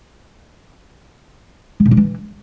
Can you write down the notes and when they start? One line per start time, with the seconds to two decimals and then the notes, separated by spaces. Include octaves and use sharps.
1.80 F3
1.86 A#2
1.91 D4
1.97 E3